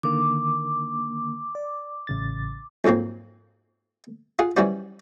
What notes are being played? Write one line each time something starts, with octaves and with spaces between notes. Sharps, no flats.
D3 D#3 A#3 D6
D5
A1 C#3 A6
F2 G#2 F#3 A#3 C4
F4 G#4 F#5
E3 F#3 G3 C#4 F#4 C5